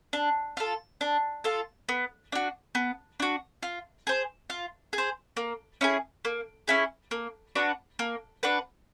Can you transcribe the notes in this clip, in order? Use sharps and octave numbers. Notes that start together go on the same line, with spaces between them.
D4
F4 A4
D4
F4 A4
B3
D4 F#4
B3
D4 F#4
F4
G#4 C5
F4
G#4
C5
A#3
C#4 E4 G#4
A#3
C#4 E4 G#4
A#3
D4 F#4 B4
A#3
D4 F#4 B4